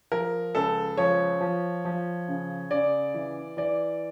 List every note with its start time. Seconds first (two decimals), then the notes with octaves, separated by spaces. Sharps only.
0.12 F3 A#4
0.55 C#2 A4
0.97 F3 C#5
1.41 F3
1.85 F3
2.28 C#3
2.71 C#3 D5
3.14 E3
3.57 E3 D5